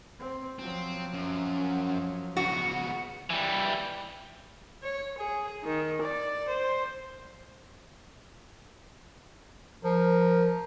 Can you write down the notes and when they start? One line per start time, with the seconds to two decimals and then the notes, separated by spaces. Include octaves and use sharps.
0.19 C4
0.59 F3 F#3 C4
1.14 F#2
2.37 C#3 B3 F#4
3.30 E3 G3
4.83 C#5
5.18 G#4
5.64 D#3
6.02 D5
6.48 C5
9.84 F3 A#4